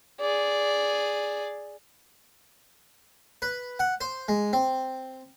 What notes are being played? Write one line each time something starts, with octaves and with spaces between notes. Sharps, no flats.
G#4 D5
B4
F#5
C5
G#3
C4